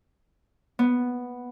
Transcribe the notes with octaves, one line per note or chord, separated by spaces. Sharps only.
B3